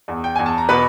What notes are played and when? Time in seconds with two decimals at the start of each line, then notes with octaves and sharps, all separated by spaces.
0.08 E2
0.24 G5
0.36 E2 G#5
0.46 A5
0.58 A#5
0.69 B2 B4 B5